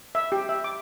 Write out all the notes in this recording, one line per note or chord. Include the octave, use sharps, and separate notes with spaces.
E5
G4
E5
D6